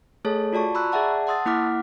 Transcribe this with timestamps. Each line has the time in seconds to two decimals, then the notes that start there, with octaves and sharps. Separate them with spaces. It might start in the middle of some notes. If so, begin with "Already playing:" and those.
0.25 A3 G#4 A4 C#5 A5
0.53 F4 F#4 D5 A5 C#6
0.75 A#5 B5 C#6 E6 F#6
0.92 G#4 D5 E5 F#5 A5
1.27 F#5 A5 C6 D#6 E6 A6
1.46 A#3 E4 F#5 D6 F6 B6